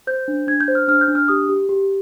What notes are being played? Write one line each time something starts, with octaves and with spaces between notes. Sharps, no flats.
C5 G6
D4
D4 G#6
G6
C5
F6
D4 F6
G6
D4
F6
G4 D#6
G4
G4